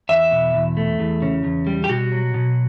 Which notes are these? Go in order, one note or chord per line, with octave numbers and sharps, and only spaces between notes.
E2 E5
B2
E2
A3
E2
C#3
E2
G3
G4
B2 F#4
F#3
B2